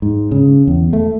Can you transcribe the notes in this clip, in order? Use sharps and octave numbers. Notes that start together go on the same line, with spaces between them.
G#2
C#3
E2
A3